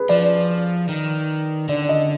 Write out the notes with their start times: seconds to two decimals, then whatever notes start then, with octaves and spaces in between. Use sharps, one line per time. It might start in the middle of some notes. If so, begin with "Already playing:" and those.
Already playing: G#4 B4
0.09 F3 D5
0.89 D#3
1.69 D3 D5
1.89 D#5